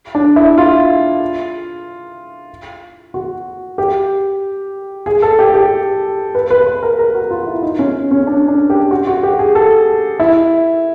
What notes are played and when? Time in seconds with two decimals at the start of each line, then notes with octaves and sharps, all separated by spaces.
0.15 D4
0.36 E4
0.58 F4
3.14 F#4
3.78 G4
5.06 G#4
5.22 A4
5.39 G4
5.54 G4
6.35 B4
6.50 B4
6.67 B4
6.83 A#4
6.99 A#4
7.14 F#4
7.31 F4
7.47 E4
7.63 D#4
7.79 C#4
8.11 C#4
8.27 D4
8.48 D4
8.70 G4
8.91 F#4
9.07 F#4
9.23 G4
9.39 G#4
9.55 A4
10.20 E4